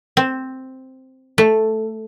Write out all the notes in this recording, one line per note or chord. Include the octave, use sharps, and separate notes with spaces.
C4
A3